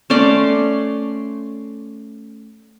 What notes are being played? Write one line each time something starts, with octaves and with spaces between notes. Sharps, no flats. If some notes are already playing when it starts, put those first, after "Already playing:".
A3 C#4 D5 C6